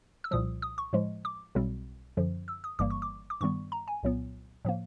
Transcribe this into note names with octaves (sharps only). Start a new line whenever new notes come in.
E6
C2 A#2 F3 D#6
D#6
C#6
A2 F3 G#3
D6
B1 B2 G3 C4
F#2 D3 F3
E6
D#6
G1 G2 E3 G3 A#3 D6
C#6
D6
D6
G2 D#3 G3 B3 C#6
A#5
G#5
C2 A#2 F#3 B3
A2 F3 A#3